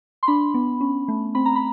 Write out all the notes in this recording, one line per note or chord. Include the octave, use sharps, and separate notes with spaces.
C6
D4 B5
B3
C#4
A3
C4 B5
A#5
B5